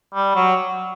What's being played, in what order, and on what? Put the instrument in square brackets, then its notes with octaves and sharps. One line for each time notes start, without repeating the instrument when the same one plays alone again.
[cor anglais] G3
F#3